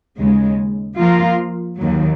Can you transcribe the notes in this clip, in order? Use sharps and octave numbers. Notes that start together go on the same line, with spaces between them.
D#2 C#3 G#3
F3 A#3 F4 A#4 F5
D#2 D#3 F#3